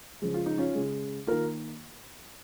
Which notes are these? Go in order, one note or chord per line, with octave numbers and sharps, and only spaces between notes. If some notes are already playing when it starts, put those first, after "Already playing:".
C#3 F3 G#3 G#4
F4
D#4
C#4 F4
C#3 G#3
D#3 A#3 F4 A#4